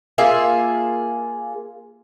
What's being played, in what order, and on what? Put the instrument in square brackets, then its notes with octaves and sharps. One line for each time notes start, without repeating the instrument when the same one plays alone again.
[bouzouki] A#3 F4 G#4 E5